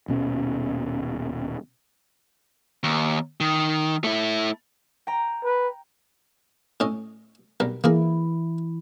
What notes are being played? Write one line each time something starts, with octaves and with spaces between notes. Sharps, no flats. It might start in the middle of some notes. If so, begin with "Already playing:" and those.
D#1 B2 C#4
D#2
D#3
A3 E4
G5 A#5
B4
A2 C#4 D#5
B1 G3 A#4
E3 A#3 E4 G#4 A#4